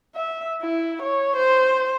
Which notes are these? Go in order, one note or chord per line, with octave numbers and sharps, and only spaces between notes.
E5
E4
C#5
C5